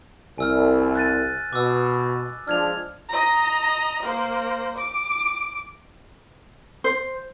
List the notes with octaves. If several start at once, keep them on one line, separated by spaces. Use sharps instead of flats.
C2 G#5 E6 F6
F#6 A6 D#7
B2 D6 E6
F3 G#3 D4 F6 G#6 F7
D#5 A#5
A#3 C5
D6
C5